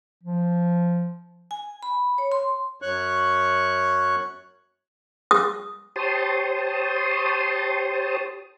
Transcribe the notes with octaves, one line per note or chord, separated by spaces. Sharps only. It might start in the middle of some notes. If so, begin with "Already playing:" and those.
F3
G#5
B5
C#5
C6
F#2 C#5 C#6 F#6
D#6
G4 C5 C#5 A5 C6 D#6